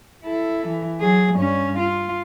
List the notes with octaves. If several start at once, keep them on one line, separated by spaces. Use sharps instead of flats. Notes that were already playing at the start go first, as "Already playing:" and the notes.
E4 A4
E3
F#3 G#4
G2 C#4
F4